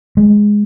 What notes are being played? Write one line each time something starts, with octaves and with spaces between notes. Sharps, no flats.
G#3